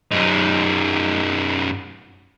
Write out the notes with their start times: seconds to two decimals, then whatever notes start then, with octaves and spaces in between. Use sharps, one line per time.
0.12 F#2 D#4